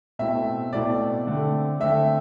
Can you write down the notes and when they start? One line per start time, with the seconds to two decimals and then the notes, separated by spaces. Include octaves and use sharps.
0.19 B2 A3 C4 E4 E5
0.73 B2 A3 C4 E4 D5
1.27 D3 A3 C4
1.80 D3 A3 C4 E5